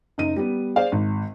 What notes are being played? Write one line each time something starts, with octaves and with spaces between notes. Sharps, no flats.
F#1 D#4 D#7
G3 B3
G#4 C5 D5 F5
G#1